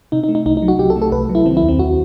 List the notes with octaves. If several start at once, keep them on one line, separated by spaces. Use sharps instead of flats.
C3 D#4
D#4
A3
D#4
C2 D#4
D#4
F#3
F#4
C3 G4
A4
A3
A4
C2 B4
F#3
E4
D#3 C4
E4
D#2
C4
D#2 F#4